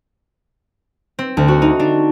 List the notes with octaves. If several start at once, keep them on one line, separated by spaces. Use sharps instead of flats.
C4
D2
F#4
D#4
D4